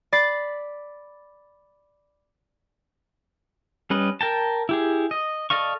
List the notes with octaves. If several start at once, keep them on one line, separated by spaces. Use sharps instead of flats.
D5 B5 A6 C7
G3 C#4 B4 D#5
A#4 G5 A5
E4 G4 G#4
D#5
A4 D5 D#5 F5 C#6